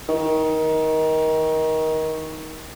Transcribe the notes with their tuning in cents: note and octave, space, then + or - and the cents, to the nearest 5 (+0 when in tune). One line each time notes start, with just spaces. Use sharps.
D#3 +20